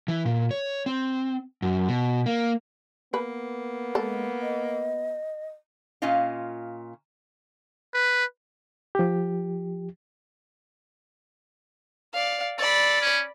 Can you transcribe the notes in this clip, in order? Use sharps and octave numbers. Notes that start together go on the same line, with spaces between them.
E3
A#2
C#5
C4
F#2
B2
A#3
A#3 B3 B4
G#3 A4
D#5
A#2 C#4 F4 D#5 F5
B4
F3 G4
D5 F5
A4 D5 B5
C#4